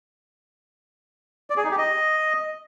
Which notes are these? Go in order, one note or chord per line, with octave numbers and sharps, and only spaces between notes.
D5
G#4
D#4
G4
D#5